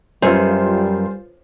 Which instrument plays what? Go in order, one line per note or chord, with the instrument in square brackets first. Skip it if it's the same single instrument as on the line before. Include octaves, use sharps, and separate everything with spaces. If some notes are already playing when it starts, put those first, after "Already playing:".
[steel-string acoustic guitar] F#2 [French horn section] G3 [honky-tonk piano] F4 B4 C5